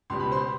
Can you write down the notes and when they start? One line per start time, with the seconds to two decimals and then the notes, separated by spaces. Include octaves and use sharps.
0.10 C#2 B2 G3 B3 C6
0.20 B5
0.31 C5 C6